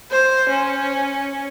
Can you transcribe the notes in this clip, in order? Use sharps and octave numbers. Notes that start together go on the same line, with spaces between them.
C5
C#4